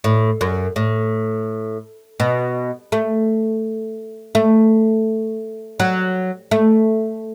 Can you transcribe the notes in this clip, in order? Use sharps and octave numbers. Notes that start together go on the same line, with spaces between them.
A2
F#2
A2
B2
A3
A3
F#3
A3